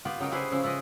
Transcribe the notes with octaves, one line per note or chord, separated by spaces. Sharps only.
B3 F4 G4 B4
C#3 F#3 D#4 A#4 G5
C#4 E4 G4 G#4 B4 C5
C#3 F3 C#4 E4
E4 F4 B4 D#5